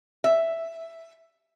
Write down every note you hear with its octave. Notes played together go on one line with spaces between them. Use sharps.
E5